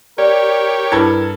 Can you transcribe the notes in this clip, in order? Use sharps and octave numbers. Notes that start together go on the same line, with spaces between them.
G4 A#4 C#5 D5
G2 E4 A4 B4 G#6